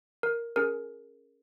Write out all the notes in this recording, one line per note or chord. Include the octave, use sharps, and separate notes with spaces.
A#4
C#4 G#4 A#4